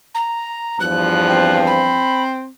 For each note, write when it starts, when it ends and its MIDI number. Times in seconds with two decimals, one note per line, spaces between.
0.14 0.78 82
0.80 2.03 40
0.80 2.03 43
0.80 2.03 53
0.80 1.56 90
1.29 2.48 60
1.67 2.22 83